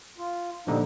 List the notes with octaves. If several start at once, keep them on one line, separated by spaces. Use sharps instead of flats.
F4
A#2 D3 F3 G3 D#4